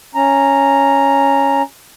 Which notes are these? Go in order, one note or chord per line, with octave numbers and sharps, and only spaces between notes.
C#4 A#5